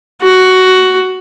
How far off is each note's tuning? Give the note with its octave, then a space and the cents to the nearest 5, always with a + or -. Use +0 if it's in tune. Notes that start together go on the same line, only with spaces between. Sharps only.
F#4 +10